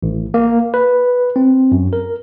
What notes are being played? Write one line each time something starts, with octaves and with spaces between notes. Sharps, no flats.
A1
A#3
B4
C4
F#2
A#4